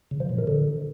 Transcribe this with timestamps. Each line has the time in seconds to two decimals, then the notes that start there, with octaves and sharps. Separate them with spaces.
0.11 C#3
0.20 F3
0.29 A#2
0.38 D#3
0.47 D3